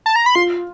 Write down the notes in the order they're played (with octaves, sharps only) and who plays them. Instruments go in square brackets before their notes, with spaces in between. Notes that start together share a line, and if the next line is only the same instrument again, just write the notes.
[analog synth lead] A5
A#5
B5
[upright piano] F4 [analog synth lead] C6